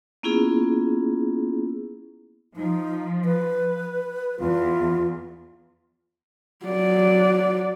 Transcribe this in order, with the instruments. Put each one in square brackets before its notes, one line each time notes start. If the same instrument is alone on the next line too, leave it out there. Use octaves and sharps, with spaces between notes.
[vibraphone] A#3 B3 C#4 E4 F4 G#4
[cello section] F3 [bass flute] D#4
[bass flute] B4
[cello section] E2 [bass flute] F4
[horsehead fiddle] F#3 D5